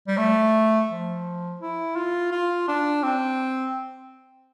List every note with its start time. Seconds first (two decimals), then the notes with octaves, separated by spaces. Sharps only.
0.07 G3
0.17 A3
0.90 F3
1.61 E4
1.96 F4
2.32 F4
2.68 D4
3.03 C4